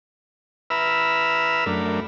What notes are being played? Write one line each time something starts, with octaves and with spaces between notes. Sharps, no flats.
B4 E5 A#5 B5 E6 F6
F#2 A3 D4 A#4